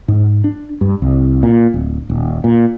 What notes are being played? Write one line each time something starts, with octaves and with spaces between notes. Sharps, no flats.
G#2
D4
G2
C2
A#2
D1
D#1
A#2